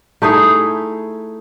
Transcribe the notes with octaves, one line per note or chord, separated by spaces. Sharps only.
A3 D#4 E4 G#4